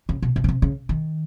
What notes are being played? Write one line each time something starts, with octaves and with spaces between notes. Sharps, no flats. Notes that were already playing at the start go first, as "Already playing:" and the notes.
C#3
B2
B2
C#3
C3
C#3
D#3